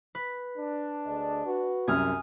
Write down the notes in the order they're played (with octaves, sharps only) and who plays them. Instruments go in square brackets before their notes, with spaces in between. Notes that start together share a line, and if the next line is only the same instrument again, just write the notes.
[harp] B4
[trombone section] D4
[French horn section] D2 G#4 D#5
F#4 B4
[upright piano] C2 F#2 [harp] G#5 D#6 F6